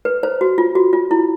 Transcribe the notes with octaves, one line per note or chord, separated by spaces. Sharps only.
B4
C5
F#4
F4
F#4
F4
E4